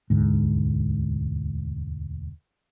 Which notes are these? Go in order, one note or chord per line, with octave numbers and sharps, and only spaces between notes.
E1 D2 G#2